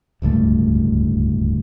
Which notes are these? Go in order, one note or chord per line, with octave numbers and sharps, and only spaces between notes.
D1 C#2 G2 A3